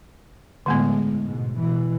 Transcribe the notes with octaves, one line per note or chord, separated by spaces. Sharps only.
A2 D3 G#3 A3 B3
G#2 B2
B2 E3